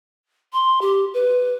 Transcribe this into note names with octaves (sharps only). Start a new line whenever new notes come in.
C6
G4
B4